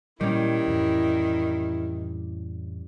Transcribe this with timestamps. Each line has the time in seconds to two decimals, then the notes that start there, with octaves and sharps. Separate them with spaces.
0.21 A#2 D#3 G3 C#4 E4
0.68 F2 A2 E3